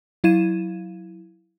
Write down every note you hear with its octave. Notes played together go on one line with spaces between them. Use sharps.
F#3 E4 F5 G#6 D#7 E7